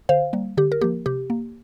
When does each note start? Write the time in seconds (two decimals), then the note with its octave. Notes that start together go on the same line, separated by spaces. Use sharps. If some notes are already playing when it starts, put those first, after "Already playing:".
0.09 D3 C5 F5
0.33 G3 A#3
0.57 D3 G4
0.72 A#4
0.81 F3 A#3 G4
1.06 C3 G4
1.30 A#3